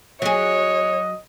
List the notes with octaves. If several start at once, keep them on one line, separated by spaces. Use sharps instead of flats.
F#3 G#4 C#5 D#5